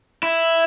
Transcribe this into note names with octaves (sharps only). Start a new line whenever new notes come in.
E4